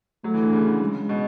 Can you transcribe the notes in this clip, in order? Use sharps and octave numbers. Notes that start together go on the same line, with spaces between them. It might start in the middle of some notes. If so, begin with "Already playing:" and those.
F#3 A3
E3
D3
C#3
G#3
B2